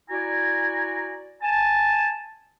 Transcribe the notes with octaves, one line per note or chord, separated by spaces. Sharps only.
E4 F#4 D5 G#5 A#5
G#5 A5